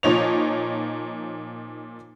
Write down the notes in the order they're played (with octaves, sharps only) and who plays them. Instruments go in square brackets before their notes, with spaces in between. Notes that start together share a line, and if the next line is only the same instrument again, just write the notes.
[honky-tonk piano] A#2 F3 D#4 C#5 F7